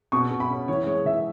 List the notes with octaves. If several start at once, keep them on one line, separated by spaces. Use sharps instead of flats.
B2 C#6
B2
B5
C#4
E3 C#5
G#3 C#5
E3 E5